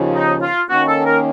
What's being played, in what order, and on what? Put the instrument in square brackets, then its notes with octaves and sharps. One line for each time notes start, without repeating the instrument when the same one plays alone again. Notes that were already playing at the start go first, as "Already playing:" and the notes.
Already playing: [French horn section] D#2 C#3 F3
[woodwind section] D#4
F4
[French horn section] D#3 A#3 C#4 [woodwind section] F#4
[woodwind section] A4
A#4